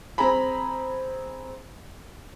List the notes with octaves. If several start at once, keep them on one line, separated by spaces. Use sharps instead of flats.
C4 G#4 G#5 A#5 B5